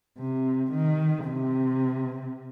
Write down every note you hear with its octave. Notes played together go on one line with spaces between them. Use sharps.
C3
D#3
C3